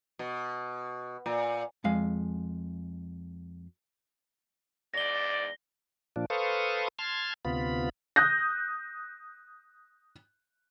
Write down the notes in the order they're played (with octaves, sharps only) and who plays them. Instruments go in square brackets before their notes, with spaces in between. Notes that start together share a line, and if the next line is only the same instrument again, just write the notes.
[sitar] B2
A#2
[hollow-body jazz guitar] F2 G#3 F5
[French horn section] E2 G#2 D5 [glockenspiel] A#6 G7
[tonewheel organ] A#2 F3 D4
A4 B4 C5 F5 C#6 D#6
A5 C6 F6 G#6
D2 C3 B3 F4 B5
[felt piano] D#6 F#6 G6 A#6